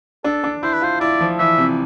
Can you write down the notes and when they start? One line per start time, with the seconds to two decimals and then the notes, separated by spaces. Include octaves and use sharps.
0.24 D4 A4
0.44 D4
0.63 E4 C5
0.73 B4
0.81 F4 C5
1.00 E4 D5
1.21 F3
1.39 E3 E5
1.58 C3